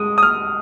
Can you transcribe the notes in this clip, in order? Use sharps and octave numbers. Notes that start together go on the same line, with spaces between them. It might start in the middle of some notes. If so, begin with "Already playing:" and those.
Already playing: G#3 D#6
D#6
F6